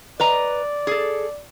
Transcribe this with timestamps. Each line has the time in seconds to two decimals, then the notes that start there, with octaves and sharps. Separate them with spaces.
0.20 B4 D5 D#5 A#5
0.87 G#4 A4